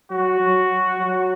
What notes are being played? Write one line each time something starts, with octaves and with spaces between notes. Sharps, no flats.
F#3 F#4
F#3
F#3